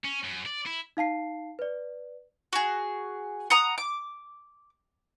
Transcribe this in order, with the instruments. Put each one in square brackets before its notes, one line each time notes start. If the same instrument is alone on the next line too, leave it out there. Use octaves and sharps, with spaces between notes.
[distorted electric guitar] C#4
F#2
D5
E4
[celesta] D#4 F5 A5 C7
B4 D5
[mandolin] F#4 G#4
F#5 A#5 D#6
D6